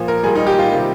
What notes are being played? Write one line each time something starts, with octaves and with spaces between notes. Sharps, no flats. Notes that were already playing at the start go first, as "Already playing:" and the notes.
Already playing: A#2 F3
A#4
A#2 G3 G#4
D#4
G4
F4
C3 D#3 G3